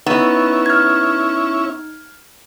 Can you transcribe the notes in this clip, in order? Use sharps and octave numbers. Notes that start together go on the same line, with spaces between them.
B3 C#4 D#4 E4
F6 G#6